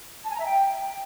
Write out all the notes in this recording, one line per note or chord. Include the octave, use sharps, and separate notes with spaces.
A5
G#5
A#5
E5
G5